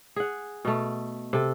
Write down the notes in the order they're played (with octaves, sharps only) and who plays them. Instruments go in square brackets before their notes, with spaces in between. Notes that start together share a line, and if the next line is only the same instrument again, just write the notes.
[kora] G#4 F#5
B2 A3
C3 A4